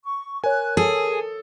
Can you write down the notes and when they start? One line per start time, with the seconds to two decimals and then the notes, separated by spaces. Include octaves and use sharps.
0.03 C#6
0.44 A#4 C#5 G#5 F#6
0.77 G#4 A4 G#5